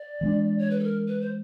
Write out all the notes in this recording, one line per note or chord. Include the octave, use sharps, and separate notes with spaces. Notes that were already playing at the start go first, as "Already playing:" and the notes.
Already playing: D5
E3 G#3 B3 D4
C#5
B4
A4
A#4
B4
C5